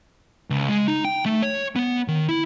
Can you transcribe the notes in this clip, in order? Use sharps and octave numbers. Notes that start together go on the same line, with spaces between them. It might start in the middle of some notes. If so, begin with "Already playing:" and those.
C#2
G#3
D#4
G5
A3
C#5
B3
D#3
E4